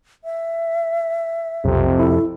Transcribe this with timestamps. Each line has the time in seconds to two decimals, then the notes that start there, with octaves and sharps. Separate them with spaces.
0.24 E5
1.65 B1 F2 C3
1.99 E4 A4